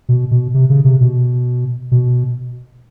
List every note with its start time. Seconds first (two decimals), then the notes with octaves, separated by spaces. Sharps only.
0.09 B2
0.31 B2
0.54 C3
0.70 C#3
0.85 C3
1.01 B2
1.92 B2